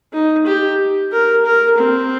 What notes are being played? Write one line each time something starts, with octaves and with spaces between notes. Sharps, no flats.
D#4
G4
A#4
A#4
C4